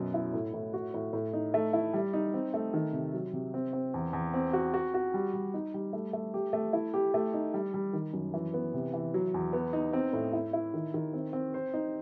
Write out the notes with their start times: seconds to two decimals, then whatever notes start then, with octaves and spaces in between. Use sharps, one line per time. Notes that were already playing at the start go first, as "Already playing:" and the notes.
Already playing: F#2 B2
0.14 E4
0.33 A2
0.53 A2
0.73 F#4
0.94 A2
1.13 A2
1.33 D#4
1.54 A3
1.73 E4
1.94 G3
2.13 D#4
2.34 C4
2.54 A3
2.74 D#3
2.93 C3
3.14 F#3
3.33 C3
3.54 C4
3.73 C4
3.94 E2
4.13 E2
4.34 C4
4.53 F#4
4.74 F#4
4.94 F#4
5.14 G3
5.33 G3
5.54 D#4
5.74 G3
5.93 A3
6.13 A3
6.34 G4
6.53 A3
6.73 E4
6.94 G4
7.14 A3
7.34 D#4
7.54 G3
7.74 G3
7.93 D#3
8.13 F#2
8.34 E3
8.54 B3
8.74 C3
8.93 E3
9.14 F#3
9.34 E2
9.53 B3
9.73 D#4
9.93 C4
10.13 A2
10.33 E4
10.53 E4
10.74 D#3
10.94 D#3
11.13 C4
11.33 C4
11.54 C5
11.74 D#4